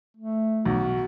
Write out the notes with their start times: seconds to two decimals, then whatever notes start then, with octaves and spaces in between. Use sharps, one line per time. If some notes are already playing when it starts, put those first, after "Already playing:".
0.17 A3
0.66 B1 F#4